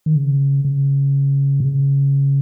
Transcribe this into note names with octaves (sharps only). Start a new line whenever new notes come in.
D#3
C#3
C#3
B2
C#3